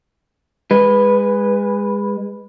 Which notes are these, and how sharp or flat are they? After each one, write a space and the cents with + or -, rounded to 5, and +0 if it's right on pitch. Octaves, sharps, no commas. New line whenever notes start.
G#3 -25 B4 +0